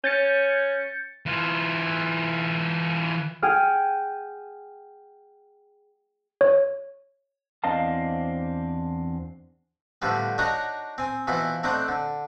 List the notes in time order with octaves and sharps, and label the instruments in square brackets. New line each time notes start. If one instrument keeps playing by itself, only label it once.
[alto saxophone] C#4 [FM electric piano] G6 A6 C#7
[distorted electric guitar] E3 F4
[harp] G#4 F#5 G5 F6
[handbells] C#5
[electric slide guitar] E2 C4 D4 D#5 F5 A5
[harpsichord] A2 D3 F3 G3 B3
D4 D#4 F#4 C#5 D#5 A#5
C4 G#5
B2 E3 F3 E4
A3 C4 D4 D#4 C5 F#5
D3